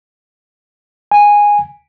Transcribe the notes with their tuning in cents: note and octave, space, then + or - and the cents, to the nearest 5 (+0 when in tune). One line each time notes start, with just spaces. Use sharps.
G#5 -10